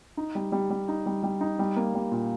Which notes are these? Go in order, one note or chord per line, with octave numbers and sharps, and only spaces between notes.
D#4
G3
G3
G3
D#4
G3
G3
D#4
G3
A#3
G3
A#2